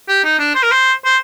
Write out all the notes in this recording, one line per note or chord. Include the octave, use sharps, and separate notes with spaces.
G4
D#4
D4
C5
A#4
C5
C5